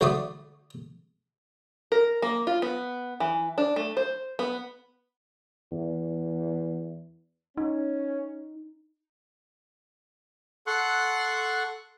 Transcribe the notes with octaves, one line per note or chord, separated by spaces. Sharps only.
D2 A3 F#4 D5 B5 D#6
A#4
A#3
F4
B3
E3
D4
A3
C5
B3
E2
C#4 D#4
A4 F#5 C6 C#6 F#6